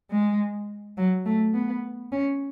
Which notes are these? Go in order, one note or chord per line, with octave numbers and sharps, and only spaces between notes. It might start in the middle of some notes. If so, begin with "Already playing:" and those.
G#3
F#3
A3
B3
C#4